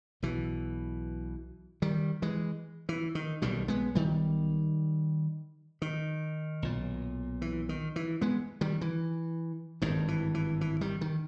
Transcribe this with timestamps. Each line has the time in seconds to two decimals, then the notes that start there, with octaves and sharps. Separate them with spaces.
0.23 B1 B2 E3
1.82 D#3 G3
2.22 E3 G#3
2.89 E3
3.15 D#3
3.42 B1 B2 D#3 G3
3.68 G#3 B3
3.95 D#3 G3
5.82 D#3
6.62 B1 A#2
7.42 E3
7.69 D#3
7.96 E3
8.21 G#3 B3
8.61 D#3 G3
8.81 E3
9.82 G#1 G2 D#3
10.08 E3
10.34 E3
10.61 E3
10.81 D#3 G3
11.01 D#3